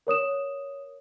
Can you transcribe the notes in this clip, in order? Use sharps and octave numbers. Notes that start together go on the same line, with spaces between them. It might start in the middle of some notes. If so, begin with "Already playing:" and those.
A#4 C#5 D#6 E7